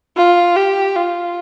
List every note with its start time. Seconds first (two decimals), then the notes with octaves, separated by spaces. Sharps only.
0.17 F4
0.56 G4
0.95 F4